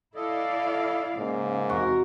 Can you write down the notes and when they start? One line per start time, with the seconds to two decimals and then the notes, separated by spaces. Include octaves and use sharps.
0.15 E4 A4 D5 D#5 F5
1.18 G#2 C#3 A#3
1.70 E2 C3 F#4 A#4